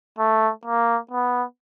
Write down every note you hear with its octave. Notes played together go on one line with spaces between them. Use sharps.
A3
A#3
B3